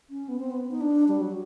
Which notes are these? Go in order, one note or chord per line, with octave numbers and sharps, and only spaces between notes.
C#4
B3
C4
B3
D#4
D4
G3
F#3